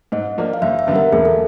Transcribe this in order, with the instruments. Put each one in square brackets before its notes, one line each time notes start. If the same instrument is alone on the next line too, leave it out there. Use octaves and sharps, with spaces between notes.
[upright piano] G#2 [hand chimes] D#5
[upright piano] F3 A#3 D4
[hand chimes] F5
[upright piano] F#1 [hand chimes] E5
[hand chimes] E5
[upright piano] F#2 D3 G3 B3
[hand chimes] A#4
[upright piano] E1 [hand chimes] G#4
[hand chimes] A4